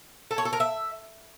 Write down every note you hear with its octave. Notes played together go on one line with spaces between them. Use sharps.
A4
C#5
A4
A#4
E5